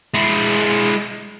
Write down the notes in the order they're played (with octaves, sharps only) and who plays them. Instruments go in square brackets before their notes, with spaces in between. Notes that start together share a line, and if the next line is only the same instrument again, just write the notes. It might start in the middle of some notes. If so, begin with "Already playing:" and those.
[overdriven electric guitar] G#3 E4